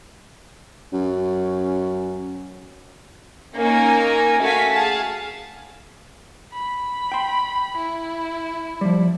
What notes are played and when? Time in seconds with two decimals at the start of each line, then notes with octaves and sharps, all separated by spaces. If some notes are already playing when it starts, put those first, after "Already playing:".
0.93 F#2 C#4
3.55 A#3 C#4 D#4 A#4 G#5
4.40 A3 F#4 F5 G#5 B6
4.71 G#4 F5 A5
6.53 B5
7.12 G5 C6
7.78 E4
8.81 F3 G3